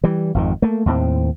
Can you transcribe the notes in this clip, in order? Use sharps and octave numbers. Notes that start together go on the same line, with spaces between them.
E3 G3
G#1 F2 D#3
A3 A#3
D#2 A2 A3 C4